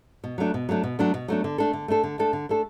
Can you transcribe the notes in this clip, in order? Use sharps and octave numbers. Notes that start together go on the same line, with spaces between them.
B2
F#3 A3 D4
B2
F#3 A3 D4
B2
F#3 A3 D4
B2
F#3 A3 D4
D3
A3 D4 A4
D3
A3 D4 A4
D3
A3 D4 A4
D3
A3 D4 A4